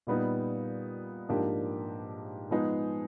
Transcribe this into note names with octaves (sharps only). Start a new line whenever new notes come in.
A#2 G3 B3 D#4
G#2 F3 A#3 D4 G4
F3 G#3 B3 D#4 G#4